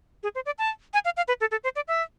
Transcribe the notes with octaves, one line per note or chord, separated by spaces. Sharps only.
G#4
C5
D5
A5
G#5
F5
F5
B4
A4
A4
C5
D5
E5